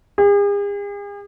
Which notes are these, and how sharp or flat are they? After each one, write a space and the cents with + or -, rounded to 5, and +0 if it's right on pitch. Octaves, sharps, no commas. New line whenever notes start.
G#4 -45